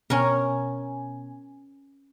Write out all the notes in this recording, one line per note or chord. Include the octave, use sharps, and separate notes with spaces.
B2 C#4 A#4 G#5